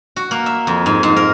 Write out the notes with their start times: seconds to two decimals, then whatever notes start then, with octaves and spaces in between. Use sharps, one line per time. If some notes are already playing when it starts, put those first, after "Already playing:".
0.16 F#4
0.31 A#3
0.46 E5
0.67 F2
0.86 G#2
1.03 G#2
1.16 A#4